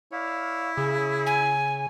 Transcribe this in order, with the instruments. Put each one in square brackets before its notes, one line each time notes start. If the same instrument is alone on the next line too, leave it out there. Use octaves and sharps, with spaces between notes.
[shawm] E4 [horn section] C#5 D5 F5
[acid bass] C#3 [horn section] G#4
[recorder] G#5